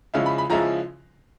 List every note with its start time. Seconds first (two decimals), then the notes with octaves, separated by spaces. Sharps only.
0.14 C#3 F3 G#3 C#4 E4 F5
0.26 B5
0.38 B5
0.50 C#3 F3 G#3 C#4 E4 A#5